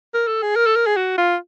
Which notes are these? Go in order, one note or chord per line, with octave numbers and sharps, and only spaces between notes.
A#4
A4
G#4
A#4
A4
A#4
G#4
F#4
F4